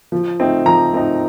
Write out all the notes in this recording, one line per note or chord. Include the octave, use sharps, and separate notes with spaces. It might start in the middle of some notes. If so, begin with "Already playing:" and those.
F3
A3 C4 D#4
F3 A#5
A3 C4 D#4